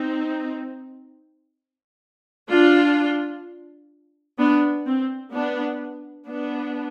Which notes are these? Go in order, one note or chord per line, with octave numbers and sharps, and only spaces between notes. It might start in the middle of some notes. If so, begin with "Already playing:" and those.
Already playing: C4 D#4
D4 F4
B3 D4
C4
B3 D4
B3 D4